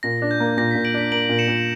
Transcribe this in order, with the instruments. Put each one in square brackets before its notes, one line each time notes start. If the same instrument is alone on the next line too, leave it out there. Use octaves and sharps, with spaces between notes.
[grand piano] A#2 [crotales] A#6
[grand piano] D4
[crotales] G6
[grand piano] A#3
[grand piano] A#2 [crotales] A#6
[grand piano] A#2 [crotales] B6
[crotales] D7 F#7
[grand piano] D4 [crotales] B6
[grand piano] A#3 [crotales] D7 F#7
[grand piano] A#2
[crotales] C#7 E7
[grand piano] A#2